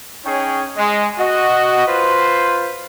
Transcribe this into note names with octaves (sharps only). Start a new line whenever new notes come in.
C#4 D#4 G#4 C#5 G5
G#3
F#4 D#5
F4 B4 C5